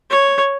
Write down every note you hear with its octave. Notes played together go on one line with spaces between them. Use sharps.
C#5